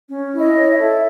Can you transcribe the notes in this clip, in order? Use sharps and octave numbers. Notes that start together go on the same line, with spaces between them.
C#4
E4
D#5
C#5
E5
A4